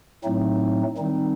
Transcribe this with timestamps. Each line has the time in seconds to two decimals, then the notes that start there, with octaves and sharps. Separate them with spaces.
0.24 A2 F#3 A3 C4 D#4
0.97 D#3 G3 C4 D#4